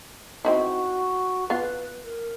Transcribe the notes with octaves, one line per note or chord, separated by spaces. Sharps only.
C4 D#4 E4 F#4
B3 F4 B4
A#4